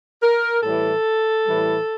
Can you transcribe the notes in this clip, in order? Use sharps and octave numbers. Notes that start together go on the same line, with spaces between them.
A#4
A2 E3 G3 A4
A2 E3 G3